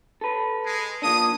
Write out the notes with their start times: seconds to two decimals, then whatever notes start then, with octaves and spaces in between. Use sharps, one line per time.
0.21 A4 B4
0.63 G#3
1.02 F3 A#3 D4 D#6